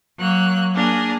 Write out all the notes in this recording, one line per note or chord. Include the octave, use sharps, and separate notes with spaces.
F#3 A#3 F#6
A#3 D4 G#4 A#4